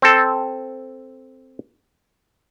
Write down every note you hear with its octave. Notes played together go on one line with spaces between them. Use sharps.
C4 A4